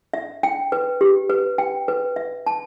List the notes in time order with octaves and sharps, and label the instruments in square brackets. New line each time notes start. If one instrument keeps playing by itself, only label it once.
[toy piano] E5
G5
B4
G4
B4
G5
B4
E5
A5